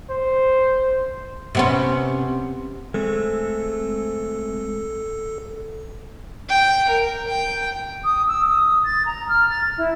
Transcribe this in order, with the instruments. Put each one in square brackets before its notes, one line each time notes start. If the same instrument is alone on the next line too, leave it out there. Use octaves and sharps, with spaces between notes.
[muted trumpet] C5
[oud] C3 B3 C#4
[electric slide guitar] G#3 A3 C4 [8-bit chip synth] A4
[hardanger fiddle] G5
A#4
G5
[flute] D#6
E6
D#6
A6
A#5
F6
A6
E4